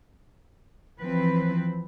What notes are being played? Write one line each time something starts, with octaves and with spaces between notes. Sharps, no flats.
E3 F3 C4 B4